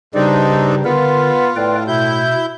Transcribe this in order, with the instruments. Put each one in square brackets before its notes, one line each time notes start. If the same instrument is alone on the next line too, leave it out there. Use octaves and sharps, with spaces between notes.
[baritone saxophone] G2 [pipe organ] C#3 G3 [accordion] C4 D4 D#4
[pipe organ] D3 A#4 [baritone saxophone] B3 [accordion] F4
[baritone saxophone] A2 [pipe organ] B4 D5 G5
[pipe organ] B2 [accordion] E4 G6